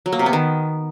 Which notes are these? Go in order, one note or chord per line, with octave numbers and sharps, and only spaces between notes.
F#3
A#3
C3
B3
D#3